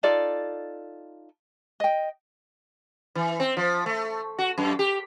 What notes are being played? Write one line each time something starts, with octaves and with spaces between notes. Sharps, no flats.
D#4 F4 A4 D5
D#5 G5
E3
C4
F3
A3
F#4
F#2
G4